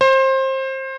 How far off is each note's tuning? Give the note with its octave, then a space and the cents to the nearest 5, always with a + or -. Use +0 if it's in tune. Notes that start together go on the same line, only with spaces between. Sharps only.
C5 +25